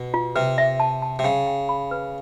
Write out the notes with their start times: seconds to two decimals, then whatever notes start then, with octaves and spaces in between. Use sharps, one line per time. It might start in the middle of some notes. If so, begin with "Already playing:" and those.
Already playing: B2
0.14 F4
0.36 C3 B4
0.58 E5
0.80 A5
1.02 A5
1.19 C3
1.24 C#3 G5
1.47 G5
1.69 B5
1.91 B4